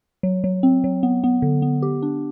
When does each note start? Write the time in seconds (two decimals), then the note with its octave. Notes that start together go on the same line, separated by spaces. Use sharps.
0.23 F#3
0.44 F#3
0.63 C4
0.84 F#3
1.03 B3
1.24 B3
1.42 D3
1.62 B3
1.83 G4
2.03 D4